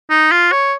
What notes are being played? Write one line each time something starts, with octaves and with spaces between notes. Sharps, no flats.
D#4
F4
C#5